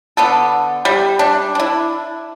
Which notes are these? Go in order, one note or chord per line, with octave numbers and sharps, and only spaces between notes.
D3 B3 A4
G3
G3 D4
D4 E4